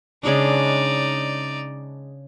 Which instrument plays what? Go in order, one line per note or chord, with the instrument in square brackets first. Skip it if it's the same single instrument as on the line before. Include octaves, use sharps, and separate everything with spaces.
[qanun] C#3 G#3 D4 [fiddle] D#4 D5